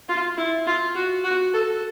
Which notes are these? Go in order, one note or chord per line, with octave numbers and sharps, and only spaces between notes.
F4
E4
F4
F#4
F#4
A4